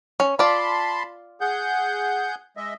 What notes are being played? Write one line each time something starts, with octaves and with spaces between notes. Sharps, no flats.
C#4
F4 D5 A5 B5 C6
G#4 F#5 G6
G#3 D#5 E5